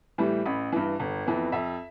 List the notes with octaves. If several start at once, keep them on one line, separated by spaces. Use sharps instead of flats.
A2 E3 G3
A1 B5
G2 E3
G1
F2 E3 B3
F2 E5